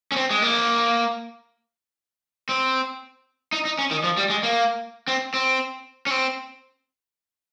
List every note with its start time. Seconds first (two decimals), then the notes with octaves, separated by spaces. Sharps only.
0.12 C#4
0.16 C4
0.30 G#3
0.42 A#3
2.49 C4
3.52 D#4
3.65 D#4
3.79 C#4
3.91 D#3
4.04 F3
4.17 G3
4.30 G#3
4.43 A#3
5.08 C4
5.34 C4
6.07 C#4
6.10 C4